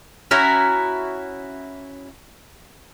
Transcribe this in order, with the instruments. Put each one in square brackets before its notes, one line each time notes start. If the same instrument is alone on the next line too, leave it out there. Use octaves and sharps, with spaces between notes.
[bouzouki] C#4 E4 F#4 A#5